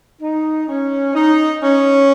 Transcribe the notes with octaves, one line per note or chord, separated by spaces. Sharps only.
D#4
C#4
D#4
C#4